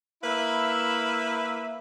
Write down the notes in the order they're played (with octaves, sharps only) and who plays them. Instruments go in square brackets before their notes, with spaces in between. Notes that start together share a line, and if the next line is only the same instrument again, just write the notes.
[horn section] A#3 E4 B4 E5